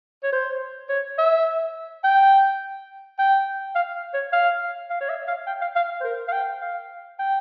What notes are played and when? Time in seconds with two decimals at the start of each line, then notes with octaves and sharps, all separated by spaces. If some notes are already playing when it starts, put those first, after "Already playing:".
0.23 C#5
0.32 C5
0.89 C#5
1.18 E5
2.04 G5
3.19 G5
3.75 F5
4.14 C#5
4.32 F5
4.90 F5
5.01 C#5
5.09 E5
5.28 F5
5.47 G5
5.61 F5
5.76 F5
6.01 C5
6.04 A#4
6.28 F5
6.32 G5
6.61 F5
7.19 G5